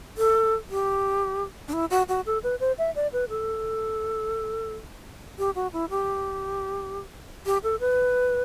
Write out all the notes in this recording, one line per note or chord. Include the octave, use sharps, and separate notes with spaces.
A4
G4
D4
E4
F#4
F#4
A4
B4
C5
E5
D5
B4
A4
G4
F#4
E4
G4
G4
A4
B4